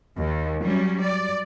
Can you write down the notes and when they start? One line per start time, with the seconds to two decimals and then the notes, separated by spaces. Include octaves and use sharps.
0.17 D#2
0.63 F#3 G3 C#4
1.01 D5